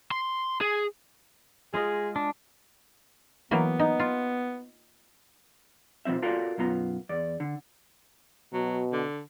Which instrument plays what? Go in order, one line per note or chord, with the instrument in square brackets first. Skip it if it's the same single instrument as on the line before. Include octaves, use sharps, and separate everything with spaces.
[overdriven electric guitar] C6
G#4
[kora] G#3 F4 D#5 [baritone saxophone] G#4
[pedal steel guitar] D4
[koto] E3 F#3 A#3 [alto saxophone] B3
[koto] D#4
F4
[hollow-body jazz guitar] B2 F3 G#3 C4 E5
F4 F#4 A4 A#4 D5 F5
B1 F#2 B3 F4 A#5
E2 D5
D3
[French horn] B2 [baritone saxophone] F#3
[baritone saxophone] D3